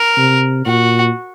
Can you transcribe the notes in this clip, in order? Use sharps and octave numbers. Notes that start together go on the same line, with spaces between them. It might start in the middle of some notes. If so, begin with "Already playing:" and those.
Already playing: A#4
C3
A#2 F#4